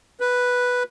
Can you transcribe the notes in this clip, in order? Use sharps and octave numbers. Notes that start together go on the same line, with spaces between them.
B4